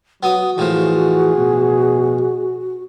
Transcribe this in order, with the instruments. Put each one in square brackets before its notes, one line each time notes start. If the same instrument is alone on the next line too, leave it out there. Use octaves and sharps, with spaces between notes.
[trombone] F#3 [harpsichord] B3 D#6 [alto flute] F#4
[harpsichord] A2 F3 [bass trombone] E3 [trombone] G#4
[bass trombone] B2